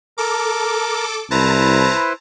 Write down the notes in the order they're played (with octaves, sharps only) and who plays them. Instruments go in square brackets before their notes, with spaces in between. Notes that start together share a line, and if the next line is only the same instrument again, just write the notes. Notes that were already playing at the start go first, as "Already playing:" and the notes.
[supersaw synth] A4 D6 [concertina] A#4
[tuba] C2 [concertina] E4 B4 C5 [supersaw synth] A5 A#5